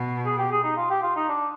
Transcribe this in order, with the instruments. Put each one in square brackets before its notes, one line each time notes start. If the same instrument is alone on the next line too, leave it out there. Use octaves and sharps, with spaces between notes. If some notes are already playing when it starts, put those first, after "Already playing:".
Already playing: [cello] B2
[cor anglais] G#4
G4
G#4
D#4
F4
G4
F4
D#4
D4